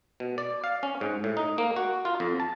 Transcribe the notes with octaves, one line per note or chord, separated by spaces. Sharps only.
B2
D5
F5
C#4
G#2
A2
D#4
A#3
F#4
F4
F2
A5